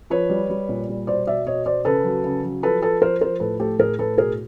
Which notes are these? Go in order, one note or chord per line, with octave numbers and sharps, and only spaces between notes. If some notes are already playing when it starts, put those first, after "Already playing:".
F3 B4 C#5
G3
G3
A#2
G3
B2 C5 D5
B2 D5 E5
B2 C#5 D#5
B2 C5 D5
C#3 A4 B4
F#3
C#3
F#3
F3 A4 B4
F3 A4 B4
F3 A#4 C5
F3 A#4 C5
A2 A4 B4
A3 G4 A4
A2 G#4 A#4
A2 A4 B4
B2 G#4 A#4